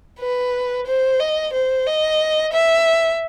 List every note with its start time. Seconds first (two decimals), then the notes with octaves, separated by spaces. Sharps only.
0.20 B4
0.87 C5
1.19 D#5
1.53 C5
1.86 D#5
2.53 E5